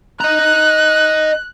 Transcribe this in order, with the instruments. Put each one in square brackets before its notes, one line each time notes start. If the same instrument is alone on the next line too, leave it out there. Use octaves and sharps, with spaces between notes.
[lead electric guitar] D#5 A#5 [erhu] F#6